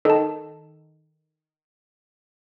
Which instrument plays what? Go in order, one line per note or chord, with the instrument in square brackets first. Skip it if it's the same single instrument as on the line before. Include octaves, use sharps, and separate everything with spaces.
[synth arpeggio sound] D#3 [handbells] A4 A5